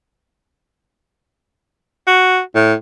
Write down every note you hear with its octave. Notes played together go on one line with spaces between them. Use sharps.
F#4
A2